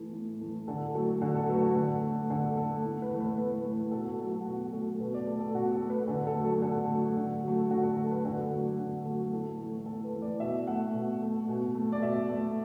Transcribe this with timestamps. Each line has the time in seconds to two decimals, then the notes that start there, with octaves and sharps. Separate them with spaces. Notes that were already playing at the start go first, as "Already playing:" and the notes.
Already playing: E3 A3
0.13 A2
0.41 E3 A3
0.68 D3 A4
0.94 F#3 A3 A4
1.21 D3 F#4
1.35 A4
1.49 F#3 B4
1.52 A3
1.63 F#4
1.75 D3
2.02 A3
2.30 D3 A4
2.57 A3 A4
2.84 A2
3.02 B4
3.11 E3 A3
3.20 B4
3.38 A2 B4
3.64 E3 A3
3.91 B2 A4
4.05 F#4
4.19 F#3 A3 A4
4.33 F#4
4.45 B2 F#4
4.73 F#3 A3 A4
5.00 B2 B4
5.14 D5
5.27 A3 A4
5.40 A4
5.54 B2 F#4
5.71 A4
5.81 A3
5.90 B4
6.08 D3 A4
6.27 A4
6.35 A3
6.40 F#3
6.45 A4
6.62 D3 A4
6.89 F#3 A3
7.17 D3
7.44 F#3 A3
7.70 D3 F#4
7.83 A4
7.97 F#3 A3 A4
8.11 B4
8.25 D3 A4
8.51 F#3 A3
8.78 D3
9.06 F#3 A3
9.32 A2 A4
9.59 E3 A3
9.86 A2 A4
10.04 B4
10.14 E3 A3
10.22 D5
10.40 B2 E5
10.67 A3 F#5
10.94 B2
11.22 A3
11.48 B2
11.75 A3
11.92 D5
12.03 B2 E5
12.29 A3